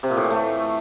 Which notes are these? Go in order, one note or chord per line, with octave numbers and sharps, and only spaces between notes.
C3
A#2
A2
E3
A3